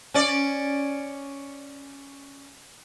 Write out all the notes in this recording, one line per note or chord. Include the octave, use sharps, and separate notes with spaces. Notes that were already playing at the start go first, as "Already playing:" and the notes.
C#4 D5